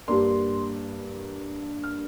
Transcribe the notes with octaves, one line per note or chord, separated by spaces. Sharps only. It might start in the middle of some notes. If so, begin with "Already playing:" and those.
G2 G3 A#3 D4 C6
F6